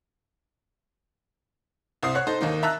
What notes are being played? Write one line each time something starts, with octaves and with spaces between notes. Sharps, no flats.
C2 C5 D#6 C7
C#5 F#5 F#6
D#4 A4 C5
D#2 D#3 A#3 D#4
E5 A5 A#5 E6 F#6